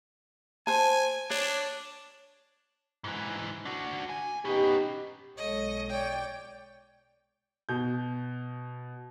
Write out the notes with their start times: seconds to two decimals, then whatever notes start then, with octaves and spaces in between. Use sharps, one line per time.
0.67 C5 G#5 A5
1.30 D4 C#5
3.04 G#2 E3
3.65 D4 F#4
4.09 G#5
4.45 B3 C#4 D#4 G4 B4
5.38 B1 G#3 A4 C#5 D#5
5.90 C#5 D5 G5
7.69 B2 G6